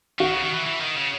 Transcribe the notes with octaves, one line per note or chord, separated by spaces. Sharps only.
D#3 F#4
C#3
D#3
E3
E3
D#3
C#3